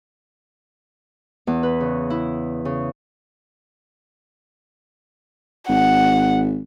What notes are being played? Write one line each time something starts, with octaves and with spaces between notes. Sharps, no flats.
E2
B4
C#3
E4
C#3
G#1 F#5